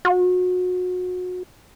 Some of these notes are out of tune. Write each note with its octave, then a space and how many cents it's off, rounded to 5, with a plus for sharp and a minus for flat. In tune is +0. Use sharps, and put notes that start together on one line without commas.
F#4 -30